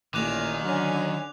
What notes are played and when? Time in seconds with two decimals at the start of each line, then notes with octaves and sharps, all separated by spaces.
0.14 A1 A#2 D#3 G#5 D6 F#6 F7
0.64 D3 F#3 C#4 G#5